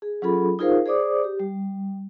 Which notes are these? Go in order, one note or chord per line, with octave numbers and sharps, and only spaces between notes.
G#4
F#3 C#4 F4 G#4 A4 B5
D#4 F4 G#4 A#4 C5 F5
G#4 C5 D5 D6 D#6
G4
G3